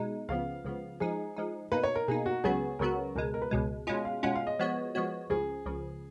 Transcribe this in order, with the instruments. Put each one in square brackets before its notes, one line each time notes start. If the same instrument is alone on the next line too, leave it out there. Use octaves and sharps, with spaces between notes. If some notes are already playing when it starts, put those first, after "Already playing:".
Already playing: [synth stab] B2 G#3 D#4
[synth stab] C#2 C#3 F3 B3 [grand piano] F5
[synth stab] C#2 C#3 F3 B3
[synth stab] F3 G#3 D#4 [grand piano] G#4
[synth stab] F3 G#3 D#4
[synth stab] B2 A#3 D#4 [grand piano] B4
[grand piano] C#5
A#4
[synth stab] B2 A#3 D#4 [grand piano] G#4
[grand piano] F#4
[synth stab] C#2 C#3 F#3 B3 F#4 [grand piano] G#4
[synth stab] C#2 C#3 F#3 B3 F#4 [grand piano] A#4
[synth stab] C#2 B2 G#3 [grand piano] A#4
[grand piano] A#4
B4
[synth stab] C#2 B2 G#3
[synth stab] B2 G#3 C#4 F4 [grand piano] D#5
[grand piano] F5
[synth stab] B2 G#3 C#4 F4 [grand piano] F#5
[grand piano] F5
D#5
[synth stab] F3 G#3 B3 F#4 C#5
F3 G#3 B3 F#4 C#5
[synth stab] C#2 C#3 F3 [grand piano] G#4
[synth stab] C#2 C#3 F3